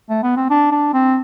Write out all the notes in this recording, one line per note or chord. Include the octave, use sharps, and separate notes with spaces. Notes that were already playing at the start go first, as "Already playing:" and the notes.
A3
B3
C4
D4
D4
C4